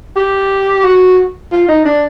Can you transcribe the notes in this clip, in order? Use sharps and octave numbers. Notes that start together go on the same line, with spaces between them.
G4
F#4
F4
D#4
D4